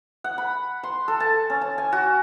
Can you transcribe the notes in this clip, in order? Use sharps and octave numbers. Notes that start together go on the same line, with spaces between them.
F#5
B5
C6
A4
A5
C#4
A5
G#5
F#4